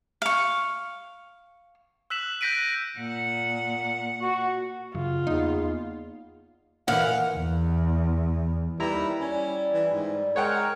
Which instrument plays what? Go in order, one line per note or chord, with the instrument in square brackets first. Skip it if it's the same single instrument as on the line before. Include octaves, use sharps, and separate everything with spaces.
[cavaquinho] F5 C#6
[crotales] E6 F#6 B6 E7 F#7
F#6 G6 A#6 B6 D7 D#7
[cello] A#2 F#5
[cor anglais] F#4
[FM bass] F#2 [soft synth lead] C#3 [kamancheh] F4
[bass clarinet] E2 [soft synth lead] A#3 [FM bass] D#4
[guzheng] A#2 E3 [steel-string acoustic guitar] F5 [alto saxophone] F#5
[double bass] E2
[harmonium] D#2 B4 [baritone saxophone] G3 [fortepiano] E4 A#5
[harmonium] G3 [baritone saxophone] C#4
[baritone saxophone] E3
G#2
[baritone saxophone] G#3 [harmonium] A#4 [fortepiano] C#5 F#5 G5